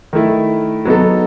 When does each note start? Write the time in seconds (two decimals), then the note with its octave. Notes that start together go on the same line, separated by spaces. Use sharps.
0.13 D#3 A3 E4
0.85 F#3 B3 D#4 A4